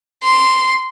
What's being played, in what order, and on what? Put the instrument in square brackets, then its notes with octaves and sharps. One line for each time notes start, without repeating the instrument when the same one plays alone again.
[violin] C6